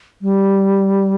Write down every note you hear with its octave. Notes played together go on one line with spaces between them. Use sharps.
G3